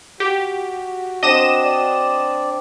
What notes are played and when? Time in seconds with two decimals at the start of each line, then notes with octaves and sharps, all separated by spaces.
0.20 F#4 G4
1.23 C4 D4 D#5 D#6 E7
1.63 D5